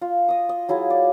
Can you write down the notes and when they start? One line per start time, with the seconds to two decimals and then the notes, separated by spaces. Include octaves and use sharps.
0.01 F4
0.28 D#5 D#6
0.49 D#5
0.69 F#3 E4 F4 G#4
0.90 D5